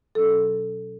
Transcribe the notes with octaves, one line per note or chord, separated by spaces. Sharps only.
B2 F#3 C#4 A4